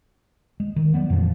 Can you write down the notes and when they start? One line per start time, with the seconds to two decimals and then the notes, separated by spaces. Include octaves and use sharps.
0.60 G#3
0.76 D#3
0.94 F#3 G3 B3
1.10 F2 A#2 E3 F3